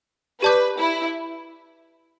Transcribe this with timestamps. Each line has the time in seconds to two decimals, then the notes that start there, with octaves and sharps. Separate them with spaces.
0.42 G4 B4 D5 A5 D6 G6
0.79 E4